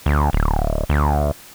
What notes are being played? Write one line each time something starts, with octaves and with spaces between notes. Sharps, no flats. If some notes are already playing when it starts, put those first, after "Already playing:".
D2
D1
D2